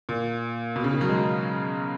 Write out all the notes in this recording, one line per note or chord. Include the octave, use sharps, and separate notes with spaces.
A#2
B2
C#3
D#3
F#3
G#3